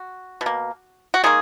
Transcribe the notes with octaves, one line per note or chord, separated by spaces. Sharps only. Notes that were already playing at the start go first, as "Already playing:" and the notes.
Already playing: F#4
B2
A#3
F#4
D#3 G#3 A#3 G#4